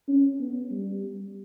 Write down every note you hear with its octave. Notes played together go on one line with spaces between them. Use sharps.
C#4
B3
G3